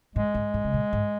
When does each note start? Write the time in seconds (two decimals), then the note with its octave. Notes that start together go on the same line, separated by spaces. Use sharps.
0.16 G#2 G#3
0.34 G#2
0.54 G#2
0.64 C#3
0.74 A#2
0.93 G#2